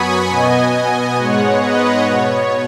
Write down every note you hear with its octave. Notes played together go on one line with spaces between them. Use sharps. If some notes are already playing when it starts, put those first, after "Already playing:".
Already playing: F#2 F#3 B3 G#5 B5 C#6 D#6
B2 B3 D#5 G#5
G#2 G#3 B3 C#5 F#5
B4 D#5
B2 B3 C#5